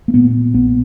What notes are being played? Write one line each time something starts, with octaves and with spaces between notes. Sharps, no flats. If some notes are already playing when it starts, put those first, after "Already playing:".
A#3
A#2 B3
A#1 B3